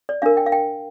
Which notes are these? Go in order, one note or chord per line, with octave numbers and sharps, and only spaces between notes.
D5
D4 A#4 F5
G5
F5
G5